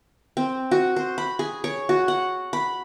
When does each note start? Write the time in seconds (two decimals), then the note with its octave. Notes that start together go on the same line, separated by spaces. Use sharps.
0.37 C4
0.71 F#4
0.96 C5
1.18 B5
1.39 G#4
1.64 C#5
1.89 F#4
2.08 F#5
2.53 B5